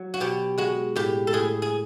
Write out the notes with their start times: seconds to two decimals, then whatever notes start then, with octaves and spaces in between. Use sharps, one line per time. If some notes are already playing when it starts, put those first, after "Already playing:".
Already playing: F#3
0.14 F#4
0.20 B2 G4
0.58 G#3 F#4
0.96 A2 G4
1.27 A4
1.33 A2 G#4
1.62 G#4